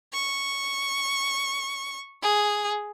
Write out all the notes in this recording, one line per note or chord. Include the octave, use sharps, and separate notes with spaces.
C#6
G#4